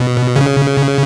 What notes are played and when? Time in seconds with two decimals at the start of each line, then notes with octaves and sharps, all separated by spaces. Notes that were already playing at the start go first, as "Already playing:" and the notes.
Already playing: B2
0.36 C#3